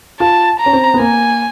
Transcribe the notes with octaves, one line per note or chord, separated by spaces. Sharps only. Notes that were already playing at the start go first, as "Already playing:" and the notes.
F4 A5
A#5
C#4
C4
B3
A#3 G#5